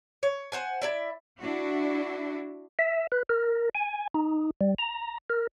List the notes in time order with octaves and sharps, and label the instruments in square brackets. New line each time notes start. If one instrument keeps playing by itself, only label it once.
[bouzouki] C#5
C5 F#5 G#5
E4 D5 E5
[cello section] D4 E4 F#4
[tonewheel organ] E5
B4
A#4
G#5
D#4
G3
A#5
A#4